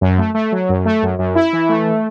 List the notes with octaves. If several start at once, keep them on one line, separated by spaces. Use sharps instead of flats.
F#2
A3
A3
F#3
F#2
A3
F#2
F#2
E4
E3
A3